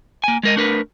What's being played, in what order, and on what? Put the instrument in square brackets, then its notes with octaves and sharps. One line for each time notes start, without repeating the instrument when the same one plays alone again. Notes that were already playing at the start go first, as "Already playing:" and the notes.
[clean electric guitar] A#3 G#5
G#3 A#4 D#5
A3 D4 A#4 B4